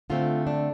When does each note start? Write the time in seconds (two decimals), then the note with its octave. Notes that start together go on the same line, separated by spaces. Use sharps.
0.10 D3 A3 C4 F4
0.47 D4